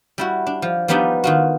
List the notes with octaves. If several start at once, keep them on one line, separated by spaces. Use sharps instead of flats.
G3 E4 F#4
D4
F3
F3 G3 B3 D4 D#4 G4
D#3 F4 F#4